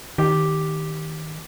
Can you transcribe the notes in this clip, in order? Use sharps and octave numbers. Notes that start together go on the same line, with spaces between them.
D#3 G4